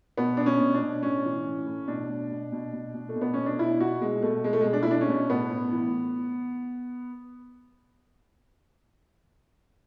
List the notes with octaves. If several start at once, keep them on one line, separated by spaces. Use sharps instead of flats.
B2 B3
B2 D4
C#4
B2
D4
B2
A2 C#4
E3
A2
A2
B2 D4
B2
B2
B2
B2
B2
A3
B2
B3
B2 C#4
D4
B2 E4
B2 F#4
B2 G#3
B2 A3
B2 G#3
A3
B2 G#3
D4
E4
B2 D4
C#4
B2
A2 B3
A2
E3